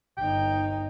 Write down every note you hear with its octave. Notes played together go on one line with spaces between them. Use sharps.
G1 D#4 G5